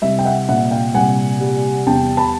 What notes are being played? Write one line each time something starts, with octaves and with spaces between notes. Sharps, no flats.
C2 E5
G5
E5 F#5
A#2 E5 F#5
F5 G5
C2 F#5 G#5
G3
E2 G5 A5
A5 B5